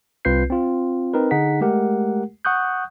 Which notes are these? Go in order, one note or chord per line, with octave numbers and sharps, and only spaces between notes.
C2 C4 F4 B4 G6 C7
C4 F4
C4 D#4 A#4 B4
D3 D#4 G#4 F#5 B6
G#3 A3 G4 A#4 F#5
F#5 C#6 D#6 F#6 G6